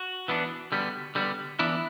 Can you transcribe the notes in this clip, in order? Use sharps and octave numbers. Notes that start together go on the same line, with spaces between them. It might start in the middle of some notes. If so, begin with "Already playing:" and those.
Already playing: F#4
E3 B3 D4
D3 G3 B3
D3 G3 B3
E3 B3 D4 E4